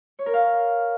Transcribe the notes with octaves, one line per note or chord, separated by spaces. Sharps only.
C#5
A#4
F5